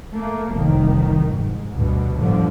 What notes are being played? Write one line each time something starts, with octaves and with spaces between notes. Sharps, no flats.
A3 A#3
F1 C2 D#3
G#2
D2 G2 B2
G1 A2 D3 F3